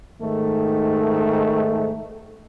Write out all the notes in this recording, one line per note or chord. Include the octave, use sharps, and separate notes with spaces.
G#2 D#3 A3